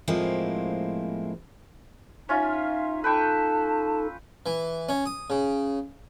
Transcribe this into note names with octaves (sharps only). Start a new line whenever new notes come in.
A2 F3 G#3 A#3 C4 E4
C#4 D#4 F4 E5
D#4 A4 B4 G5 A5 C#6
E3
C#4
D#6
C#3